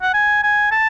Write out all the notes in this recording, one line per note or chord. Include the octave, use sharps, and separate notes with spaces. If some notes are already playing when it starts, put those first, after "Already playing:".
F#5
G#5
G#5
A5